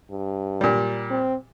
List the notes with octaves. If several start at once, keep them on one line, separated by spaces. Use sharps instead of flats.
G2
A#2 G3
C4